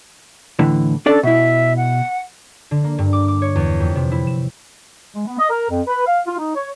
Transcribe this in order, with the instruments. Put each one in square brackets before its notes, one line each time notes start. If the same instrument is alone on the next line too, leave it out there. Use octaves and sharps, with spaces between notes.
[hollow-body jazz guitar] A2 D3 E3
[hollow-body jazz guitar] C#4 D4 D5 [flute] A4
[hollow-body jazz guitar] B2 E4 [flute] E5
[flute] F#5
[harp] D3
A#3
G2
D6
D6
C#5
E2
F2
C3
E4
E7
[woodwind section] G#3
B3
D#5
A#4
F2
B4
F5
F4
D#4
C#5